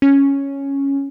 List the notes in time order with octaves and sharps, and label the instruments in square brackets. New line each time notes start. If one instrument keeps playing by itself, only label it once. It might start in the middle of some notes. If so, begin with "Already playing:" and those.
[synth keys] C#4